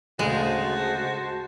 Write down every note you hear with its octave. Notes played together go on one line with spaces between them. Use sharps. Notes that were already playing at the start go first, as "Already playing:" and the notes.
D2 C#3 G#3 F#4 C5 A5